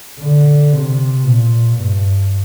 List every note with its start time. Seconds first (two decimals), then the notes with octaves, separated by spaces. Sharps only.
0.21 D3
0.73 C3
1.25 A#2
1.78 G2